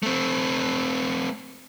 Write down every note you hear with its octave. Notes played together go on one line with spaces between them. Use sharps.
A3 C4